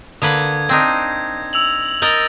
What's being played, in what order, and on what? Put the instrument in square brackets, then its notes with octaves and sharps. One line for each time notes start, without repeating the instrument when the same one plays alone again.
[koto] D3 A#3 B4 [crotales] D#6 G#6
[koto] C4 D4 D#4 [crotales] A#6
[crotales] E6 F7 F#7
[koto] A#4 D#5 [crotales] G6 A6 F7